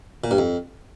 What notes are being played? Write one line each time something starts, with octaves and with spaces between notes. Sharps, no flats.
A#2
G2
F2